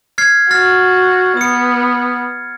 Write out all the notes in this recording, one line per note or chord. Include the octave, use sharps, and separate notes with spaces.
F6 G#6 C7
F#4 F6 A6 C7
B3 D#6 C#7